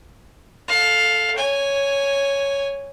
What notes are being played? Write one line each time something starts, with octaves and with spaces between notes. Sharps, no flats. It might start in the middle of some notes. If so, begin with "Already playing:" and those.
A4 F5
C#5 G#5